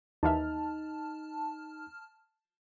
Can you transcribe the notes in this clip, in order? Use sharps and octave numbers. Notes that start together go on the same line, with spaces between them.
D#2 E3 D#4 E5 A5 F6